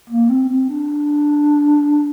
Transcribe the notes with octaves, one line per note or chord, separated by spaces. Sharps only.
A#3
C4
C4
D4